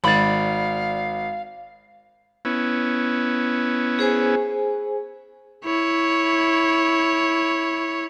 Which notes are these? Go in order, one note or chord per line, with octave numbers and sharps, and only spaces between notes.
G#1 D5 F5 B5
B3 C#4 E4
G#4 C5 G#5
E4 C#5